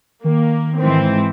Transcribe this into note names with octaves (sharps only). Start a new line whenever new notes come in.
D#3 A#3
G#2 E3 C4